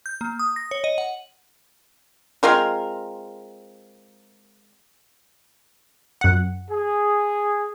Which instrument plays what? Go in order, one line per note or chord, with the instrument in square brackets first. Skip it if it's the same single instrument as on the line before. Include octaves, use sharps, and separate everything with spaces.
[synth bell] G6
A#3
D#6
A#6
C#5
D#5
F#5
[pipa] G#3 C4 F4 A#4
[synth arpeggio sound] F#2 F#5
[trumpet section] G#4